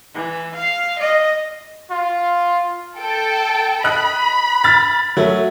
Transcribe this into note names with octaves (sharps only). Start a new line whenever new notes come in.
E3
F5
D#5
F4
A4 G5
D#5 B5 F#6
F6 A6 B6
F#3 A3